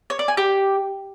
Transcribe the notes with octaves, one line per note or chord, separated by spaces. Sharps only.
C#5
D5
G#5
G4